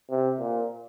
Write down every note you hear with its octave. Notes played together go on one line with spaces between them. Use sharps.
C3
A#2